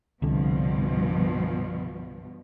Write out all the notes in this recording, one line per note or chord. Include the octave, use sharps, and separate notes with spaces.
C2 G2 B2 D3 F3